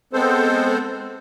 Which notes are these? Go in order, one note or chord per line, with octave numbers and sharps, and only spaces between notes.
G#3 B3 C4 A4 C5